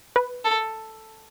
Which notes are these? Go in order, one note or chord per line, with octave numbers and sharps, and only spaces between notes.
B4
A4